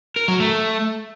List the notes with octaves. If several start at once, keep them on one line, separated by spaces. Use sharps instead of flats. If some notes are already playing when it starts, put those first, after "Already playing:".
A#4
F#3
A3